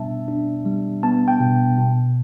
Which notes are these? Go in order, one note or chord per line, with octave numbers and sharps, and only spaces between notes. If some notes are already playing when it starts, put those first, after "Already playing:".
Already playing: B2 G3 B3 D4 E5 A5
D4
G3
B3 A5
G5
B2
B2